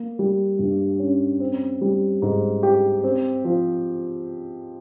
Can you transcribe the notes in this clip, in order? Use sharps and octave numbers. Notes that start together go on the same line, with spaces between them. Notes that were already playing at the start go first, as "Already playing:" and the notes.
Already playing: A#3
G3
G2
C#4
C4
G3
G#2
G4
C4
F3